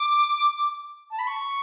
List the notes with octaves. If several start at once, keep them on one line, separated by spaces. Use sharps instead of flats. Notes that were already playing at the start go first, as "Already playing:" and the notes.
Already playing: D6
A5
B5
C#6